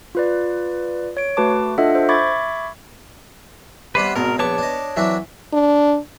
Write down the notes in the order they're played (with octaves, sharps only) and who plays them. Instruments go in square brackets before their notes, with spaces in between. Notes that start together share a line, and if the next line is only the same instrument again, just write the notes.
[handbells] F4 B4 D5
C#5 D7
A3 F#4 B4 A5 D6
D4 F4 A4 D#5 E5 F#5
C5
E5 B5 C#6 D6 G#6 A6
[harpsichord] C3 G3 B3 [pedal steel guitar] B4 C5
[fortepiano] G#1 B2 [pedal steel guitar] A#4 [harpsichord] D#5
[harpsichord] A#1 C#6 [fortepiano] B3 [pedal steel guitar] C#5 A5 D6
[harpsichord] D4 D#5
[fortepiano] E3 E5 [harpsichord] F#3 C4 D4
[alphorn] D4